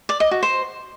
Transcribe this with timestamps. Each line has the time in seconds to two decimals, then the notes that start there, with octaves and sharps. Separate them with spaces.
0.09 D5
0.20 D#5
0.31 F#4
0.43 C5